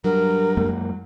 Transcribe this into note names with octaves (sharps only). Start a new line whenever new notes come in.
G2 F#3 A#4
F#2 G#3 A#3